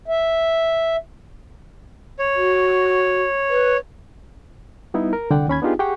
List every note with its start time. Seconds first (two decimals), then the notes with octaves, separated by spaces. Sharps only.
0.08 E5
2.19 C#5
2.36 F#4
3.50 B4
4.94 G3 B3 D#4 E4
5.13 A#4
5.30 C2 D3 D5 F#5 G5
5.48 D#2 C#4 B5 G#6
5.62 B3 D4 D#4 F4 G4 G#4
5.79 G4 G#4 F#5 G5 C#6